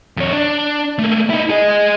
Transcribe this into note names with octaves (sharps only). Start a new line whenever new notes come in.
F2 C#5
D4
A3 A#3
D#4 E4
G#4 D#5